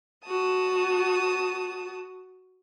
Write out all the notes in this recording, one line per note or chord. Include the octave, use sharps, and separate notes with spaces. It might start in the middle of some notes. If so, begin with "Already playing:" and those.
F#4 A5 D#6